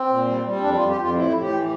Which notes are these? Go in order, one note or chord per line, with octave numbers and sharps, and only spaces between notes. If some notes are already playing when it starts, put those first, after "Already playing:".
Already playing: C4
A#2
G3
G3
C4
F2 D4
F2 F4
G4
F2 F4
A2 E4
A2
G4
E3